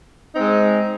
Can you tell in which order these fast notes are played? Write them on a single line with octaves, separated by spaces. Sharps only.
D#4 C4 G#3